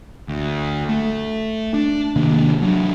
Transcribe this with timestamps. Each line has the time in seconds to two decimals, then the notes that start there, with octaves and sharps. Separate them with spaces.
0.28 D2
0.89 A3
1.74 D4
2.16 C3 D#3 A#3 D4
2.62 F#3 D4